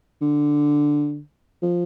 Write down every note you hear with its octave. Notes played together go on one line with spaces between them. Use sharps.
D3
F3